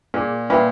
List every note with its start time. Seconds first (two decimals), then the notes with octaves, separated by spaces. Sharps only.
0.14 A#2 G#4
0.50 A#2 B4 E5 G5 B5